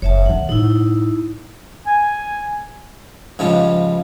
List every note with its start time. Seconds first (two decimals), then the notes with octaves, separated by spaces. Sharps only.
0.02 F#1 C#5 E5 A5
0.26 D#3 G3 F#5
0.49 A2 D#4 E4
1.86 G#5
3.39 G#2 C#3 F3 G3 F4